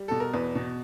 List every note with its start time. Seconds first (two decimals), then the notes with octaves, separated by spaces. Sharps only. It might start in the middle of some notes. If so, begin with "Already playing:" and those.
Already playing: G3
0.08 B2 A4
0.20 A#4
0.33 E2 B4
0.55 B2